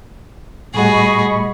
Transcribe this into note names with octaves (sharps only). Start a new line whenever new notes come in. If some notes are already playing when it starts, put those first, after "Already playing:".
A2 G3 A3 F#4 G#4 D#5 B5 C#6